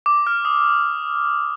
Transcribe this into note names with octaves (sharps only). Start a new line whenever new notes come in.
D6
F6
D#6